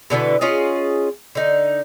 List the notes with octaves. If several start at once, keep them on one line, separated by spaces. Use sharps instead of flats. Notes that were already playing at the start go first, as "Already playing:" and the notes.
B2 D3 E3 B3
C#4 F4 G#4 D#5
D3 D#4